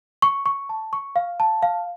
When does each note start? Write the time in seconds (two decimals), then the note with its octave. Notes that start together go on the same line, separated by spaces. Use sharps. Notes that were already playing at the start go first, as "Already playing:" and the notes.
0.22 C#6
0.46 C#6
0.69 A5
0.93 C#6
1.16 F5
1.40 A5
1.63 F5